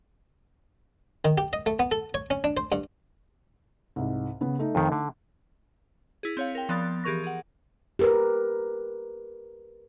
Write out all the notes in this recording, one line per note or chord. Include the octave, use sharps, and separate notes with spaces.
D#3
G4
D#5
A3
B3
A4
C#5
C#4
D4
C5
G2
C2 G#2
C#3 B3
A3 D#4
F2 D#3
D3
E4 G#4
C4 C#5 F5
A#4 G5
F3 B3 D5 D#6 A6
E3 G4 G#4 A#4 C#6 A#6
G#4 F#5
G4 A#4 B4